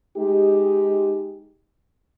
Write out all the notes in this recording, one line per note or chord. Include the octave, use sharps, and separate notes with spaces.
G#3 D#4 G4